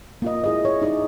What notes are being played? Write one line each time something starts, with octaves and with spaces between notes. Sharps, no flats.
A#3 F4 D#5
E4 G#4 D#5
C#5
D#4 G#4 D5 D#5